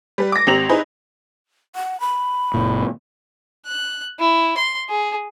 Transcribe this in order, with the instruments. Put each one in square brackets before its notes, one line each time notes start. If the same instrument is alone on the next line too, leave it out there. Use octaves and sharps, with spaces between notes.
[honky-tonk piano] G3 B4
D6 A#6
G#1 C4 G4 A#5 F7 F#7
D#4 E4 G#4 B4 C5
[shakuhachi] F#5
B5
[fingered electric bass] F#1 A#2
[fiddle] F#6
E4
C6
G#4